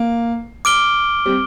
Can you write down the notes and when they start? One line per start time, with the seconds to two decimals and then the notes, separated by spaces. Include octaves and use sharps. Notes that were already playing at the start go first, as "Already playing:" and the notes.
Already playing: A#3
0.65 D6 F6 D7 G7
1.26 G3 C4